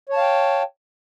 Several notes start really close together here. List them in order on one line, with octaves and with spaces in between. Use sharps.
C#5 A5 F5 G5